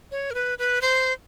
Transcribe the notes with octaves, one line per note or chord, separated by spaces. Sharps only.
C#5
A#4
B4
B4
C5